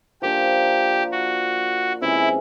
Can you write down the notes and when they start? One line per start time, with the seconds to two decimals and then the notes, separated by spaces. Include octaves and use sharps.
0.22 F3 A#3 D4 G4
1.12 F#4
2.01 C3 E3 G#3 C#4 E4